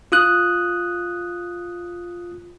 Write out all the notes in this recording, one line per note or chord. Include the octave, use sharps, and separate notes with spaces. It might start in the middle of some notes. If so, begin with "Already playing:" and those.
F4 D#6 F#6